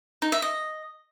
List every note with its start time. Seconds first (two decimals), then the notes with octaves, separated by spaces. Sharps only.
0.22 D#4
0.32 E5
0.42 D#5